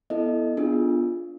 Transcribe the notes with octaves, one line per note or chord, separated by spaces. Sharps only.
B3 E4 A4 D#5
B3 D4 F4 G#4